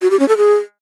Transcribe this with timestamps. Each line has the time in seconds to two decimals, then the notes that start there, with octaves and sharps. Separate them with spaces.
0.02 F#4
0.11 G4
0.19 C#4
0.28 A4
0.37 G#4